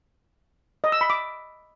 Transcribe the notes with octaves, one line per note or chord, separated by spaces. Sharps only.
D#5
E6
B5
D6